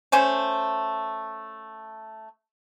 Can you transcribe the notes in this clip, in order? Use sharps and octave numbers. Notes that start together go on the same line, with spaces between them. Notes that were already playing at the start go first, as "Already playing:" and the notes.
A3 C#4 C5 G#5